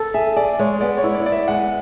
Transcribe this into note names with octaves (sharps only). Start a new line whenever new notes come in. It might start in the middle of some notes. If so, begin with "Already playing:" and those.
Already playing: A4
G#4 E5
G#4 D5
G#3 C#5
B3 D5
C#5
E4
D5
B3 D5
E5
G#3 F#5